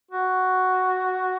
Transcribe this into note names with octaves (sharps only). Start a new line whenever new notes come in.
F#4